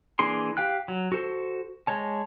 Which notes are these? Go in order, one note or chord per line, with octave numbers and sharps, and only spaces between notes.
E3 A#3 D4 G#4 C6
G4 F5 G5 F#6
F#3
F#4 A4 C5
G#3 C#5 A5